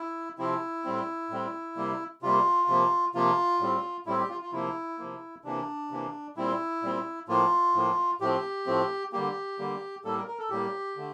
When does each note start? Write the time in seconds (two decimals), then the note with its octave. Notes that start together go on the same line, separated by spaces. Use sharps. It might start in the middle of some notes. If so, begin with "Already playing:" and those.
Already playing: E4
0.38 C3 F3 C4 E4
0.84 A2 G3 C4
1.30 A2 G3 C4
1.76 C3 G3 A#3
2.23 C3 G3 A#3 F4
2.68 C3 F3 A#3
3.14 C3 F3 A#3 F4
3.60 A2 G3 C4
4.06 A2 G3 C4 E4
4.18 G4
4.30 F4
4.41 F4
4.52 C3 F3 A#3 E4
4.99 C3 F3 A#3
5.44 C3 E3 A#3 D4
5.91 C3 E3 A#3
6.37 A#2 G3 C4 E4
6.83 A#2 G3 C4
7.28 A2 F3 A#3 F4
7.74 A2 F3 A#3
8.20 A2 F3 A3 C4 G4
8.66 A2 F3 A3 C4
9.12 D3 G3 A#3 G4
9.59 D3 G3 A#3
10.04 A2 G3 A#3 A4
10.16 A#4
10.28 A#4
10.39 A4
10.50 A2 G3 A#3 G4
10.96 D3 A3